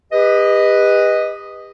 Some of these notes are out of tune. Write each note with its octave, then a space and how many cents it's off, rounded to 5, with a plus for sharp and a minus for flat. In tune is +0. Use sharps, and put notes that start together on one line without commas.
G4 +40 B4 +0 D#5 +0